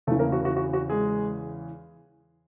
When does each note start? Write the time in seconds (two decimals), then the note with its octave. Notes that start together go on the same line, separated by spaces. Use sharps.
0.07 E2 C#3 E3 A3 A4
0.19 A#3 A#4
0.32 F#4
0.45 F#4
0.57 F#4
0.73 F#4
0.90 G#3 G#4